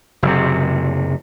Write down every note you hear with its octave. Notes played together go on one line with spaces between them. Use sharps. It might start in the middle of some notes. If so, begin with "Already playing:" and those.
F#1 C3